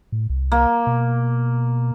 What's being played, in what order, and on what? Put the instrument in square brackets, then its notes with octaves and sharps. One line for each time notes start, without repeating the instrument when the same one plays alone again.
[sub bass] A2
C2
[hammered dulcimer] A#3
[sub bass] B2